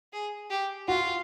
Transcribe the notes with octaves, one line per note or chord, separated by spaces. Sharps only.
G#4
G4
F4 F#4